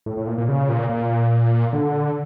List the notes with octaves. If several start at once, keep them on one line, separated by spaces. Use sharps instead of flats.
A2
A2
A#2
A#2
C#3
A#2
A#2
D3